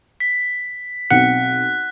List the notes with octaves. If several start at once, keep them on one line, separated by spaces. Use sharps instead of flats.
B6
B1 C4 F#5 F#6